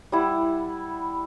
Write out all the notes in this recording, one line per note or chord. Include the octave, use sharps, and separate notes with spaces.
G3 E4 F#5